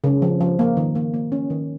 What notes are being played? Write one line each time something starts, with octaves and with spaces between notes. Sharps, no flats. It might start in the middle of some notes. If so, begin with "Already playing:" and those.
C#3
F3
F3
A#3
D#3
A#3
A#3
C#4
D#3